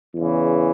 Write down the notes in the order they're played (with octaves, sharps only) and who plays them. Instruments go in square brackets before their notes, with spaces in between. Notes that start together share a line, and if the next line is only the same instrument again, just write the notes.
[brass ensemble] E2 C#3 E3